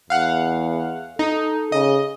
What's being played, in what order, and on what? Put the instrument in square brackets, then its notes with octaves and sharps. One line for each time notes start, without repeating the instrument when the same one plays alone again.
[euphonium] E2 [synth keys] F5 F#5
[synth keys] D#4 [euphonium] A4
[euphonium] C#3 [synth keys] D#5